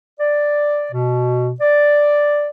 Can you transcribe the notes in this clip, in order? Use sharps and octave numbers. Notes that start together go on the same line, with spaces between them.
D5
B2
D5